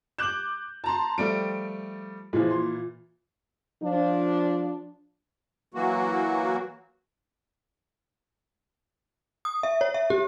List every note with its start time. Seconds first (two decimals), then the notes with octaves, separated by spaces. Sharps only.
0.18 D6 F#6 G6 E7 F#7
0.84 A5 A#5 C6
1.18 F3 G3 A3 D7
2.33 A#2 E3 F3 G#3
2.51 C6
3.82 F3 D4
5.74 E3 F#3 A#3 F#4
9.45 D#6
9.63 E5
9.81 C#5
9.94 E5
10.10 G4